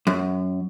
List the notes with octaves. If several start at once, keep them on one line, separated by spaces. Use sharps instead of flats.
F#2